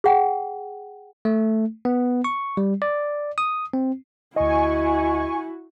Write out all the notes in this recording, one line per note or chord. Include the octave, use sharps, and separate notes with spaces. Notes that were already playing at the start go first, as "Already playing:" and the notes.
G#4 F#5 G5
A3
B3
C#6
G3
D5
D#6
C4
D2 E4 F#4 D#5 G#5 C#6